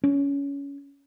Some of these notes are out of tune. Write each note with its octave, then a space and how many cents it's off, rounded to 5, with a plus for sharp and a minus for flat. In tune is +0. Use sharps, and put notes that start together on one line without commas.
C#4 +20